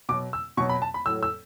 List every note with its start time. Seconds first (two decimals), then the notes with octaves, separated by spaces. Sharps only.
0.09 B2 D6
0.12 F#3
0.33 E6
0.57 B2 F#3 C#6
0.70 B5
0.82 A5
0.94 B5
1.06 A2 F#3 E6
1.23 E6